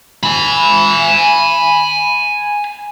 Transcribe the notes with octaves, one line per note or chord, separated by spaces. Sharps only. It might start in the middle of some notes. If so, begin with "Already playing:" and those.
G#5 B5